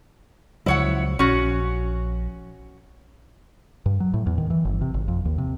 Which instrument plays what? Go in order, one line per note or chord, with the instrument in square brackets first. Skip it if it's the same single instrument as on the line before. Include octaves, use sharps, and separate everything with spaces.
[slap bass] C#2 F3 F#3 [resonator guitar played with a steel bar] E4 C#5 F#5
[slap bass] A#1 [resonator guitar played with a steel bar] C#4 F#4
[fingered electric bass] G2
F#3
A2
E2
D#3
E3
G1
C3
G#1
F2
D#2
C3